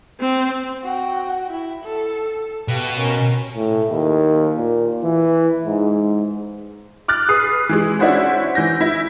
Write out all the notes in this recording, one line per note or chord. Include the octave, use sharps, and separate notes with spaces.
C4
F#4 G5
E4
A4
B2 G4 F5
C#4 A#4
A2
D#2
A#2
E3
G#2
D6 F6 F#6 A6
G#4 B4 D#6 C7
E3 G#3
C#4 D4 E4 F#4 C5 C#5
E3 G6 A#6
E4